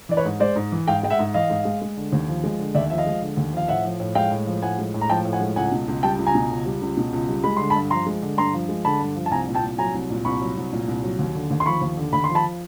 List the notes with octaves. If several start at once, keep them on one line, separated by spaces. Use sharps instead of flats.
E3 D5
B4 C#5
G#2
G#3 C5 D5
G#2
E3
G#2 F5 G5
G#3 G5
E5 F#5
G#2
E3 D#5 F5
G#2
G#3
G#3
D3
D#2
F3
G#3
D3
D#2 D5 E5
F3 E5
D#5 F5
G#3
D3
D#2
F3 F5
A2 E5 F#5
F3
A2
G#3 F5 G5
A2
F3
A2 F#5 G#5
G#3
A2
A#5
F3 G5 A5
A2
F#5 G#5
G#3
C#2 F#5 G#5
B2
C#2
G3 G5 A5
C#2
G#5 A#5
B2
C#2
G3
C#2
B2
C#2
G3
G#3 B5
D3 C6
A5 B5
G2
F3 A#5 C6
G#3
D3
G2 A#5 C6
F3
G#3
D3 A5 B5
G2
F3
A5
C2 G#5 A#5
A#2
G5 A5
C2
F#3 G#5 A#5
C2
A#2
C2 B5 C#6
F#3
C2
A#2
C2
F#3
D#2
D3
D#2
C6
F3 B5 C#6
D#2
D3
D#2 B5
C6
F3
A5 B5